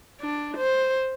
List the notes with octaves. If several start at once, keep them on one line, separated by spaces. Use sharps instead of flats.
D4
C5